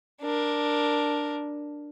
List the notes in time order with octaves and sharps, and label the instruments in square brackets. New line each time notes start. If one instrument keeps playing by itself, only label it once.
[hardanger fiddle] D4 A#4